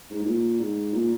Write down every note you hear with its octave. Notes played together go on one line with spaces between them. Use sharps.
G#2
G#2
A#2
G#2
A#2